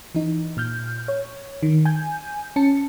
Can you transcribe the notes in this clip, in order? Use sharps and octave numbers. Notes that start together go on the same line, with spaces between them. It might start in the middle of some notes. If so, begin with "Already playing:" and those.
E3 D#4
A#2 F6 G6
C#5
D#3
G#5 G6
C#4 A5 C#7